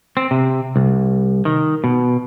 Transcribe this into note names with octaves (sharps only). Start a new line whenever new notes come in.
C4
C3
C2
D#3
B2